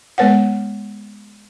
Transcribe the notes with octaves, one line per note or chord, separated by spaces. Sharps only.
G#3 B3 B4 C#5 F#5